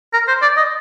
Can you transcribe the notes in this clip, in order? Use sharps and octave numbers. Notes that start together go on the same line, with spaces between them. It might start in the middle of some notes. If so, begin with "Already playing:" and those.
A#4
C5
D5
D#5